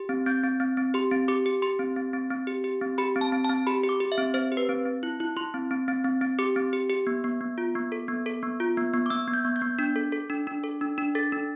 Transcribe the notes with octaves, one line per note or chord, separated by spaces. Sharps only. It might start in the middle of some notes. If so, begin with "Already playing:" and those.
Already playing: G4
C4
C4 G6
C4
C4
C4
G4 C6
C4
G4 D6
G4
G4 C6
C4
C4
C4
C4
G4
G4
C4
G4 B5
C4
A5
C4
A5
C4
G4 B5
G4
D6
G4
E5
C4
C4 C5
G4
B4
C4
C4
E4
E4
E4 C6
C4
C4
C4
C4
C4
G4 D6
C4
G4
G4
B3
B3
B3
F4
B3
A4
B3
A4
B3
F4
B3
B3
D6
B3 E6
B3
G6
B3
G6
B3
D4 G6
A4
A4
D4
D4
A4
D4
D4
A4 A6
D4